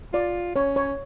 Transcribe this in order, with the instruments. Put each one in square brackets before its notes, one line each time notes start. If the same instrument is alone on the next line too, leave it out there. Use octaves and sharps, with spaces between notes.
[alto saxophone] F4 [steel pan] D5
[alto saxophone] C#4 [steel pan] C#5
[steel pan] C#5